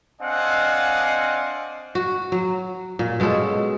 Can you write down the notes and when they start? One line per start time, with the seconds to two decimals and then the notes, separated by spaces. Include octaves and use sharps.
0.21 C4 D4 D#5 F5 F#5 G#5
1.95 F#4
2.32 F#3
2.99 A#2
3.20 B2 G#3 C#4 A4